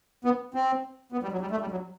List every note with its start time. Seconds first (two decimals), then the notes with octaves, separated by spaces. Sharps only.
0.25 B3
0.54 C4
1.12 B3
1.23 G3
1.32 F#3
1.41 G3
1.51 A3
1.61 G3
1.71 F#3